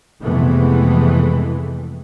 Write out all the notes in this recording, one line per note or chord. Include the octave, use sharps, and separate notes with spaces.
F2 C3 E3 G#3 A3 B3